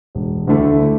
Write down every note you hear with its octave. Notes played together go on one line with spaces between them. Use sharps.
E1
D2 D3 A3 E4